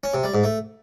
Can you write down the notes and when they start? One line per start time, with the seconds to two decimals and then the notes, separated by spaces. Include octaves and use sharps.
0.04 C#4
0.14 C3
0.24 G3
0.34 G#2
0.44 A3